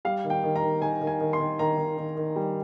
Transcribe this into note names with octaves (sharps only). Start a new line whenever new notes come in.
G3 F5
D#3
G5
D#3
A#5
D#3
D#3 G#5
D#3
G#5
D#3
C6
D#3
D#3 A#5
D#3
D#3
D#3
G3